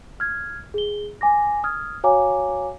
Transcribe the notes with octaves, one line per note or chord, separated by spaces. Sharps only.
F6 G#6
G#4 G7
G#5 D6 A#6
D#6 F6 G#6
F#4 C#5 F5 G#5 A#5 D6